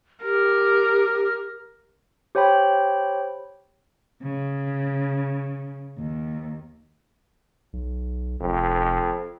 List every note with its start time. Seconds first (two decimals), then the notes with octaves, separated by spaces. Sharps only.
0.24 G4 A#4
2.35 G4 C5 C#5 G5 B5
4.22 C#3
5.98 D#2
7.73 B1
8.41 F1 F2